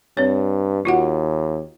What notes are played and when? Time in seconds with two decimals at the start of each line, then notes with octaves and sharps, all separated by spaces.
0.17 G2 C4 C#5
0.85 D#2 F4 F#4 F#5